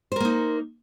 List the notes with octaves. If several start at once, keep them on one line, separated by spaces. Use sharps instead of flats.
A#3 D#4 A#4 C5